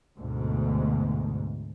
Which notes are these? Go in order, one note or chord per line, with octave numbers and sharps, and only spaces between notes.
D2 G#2 B2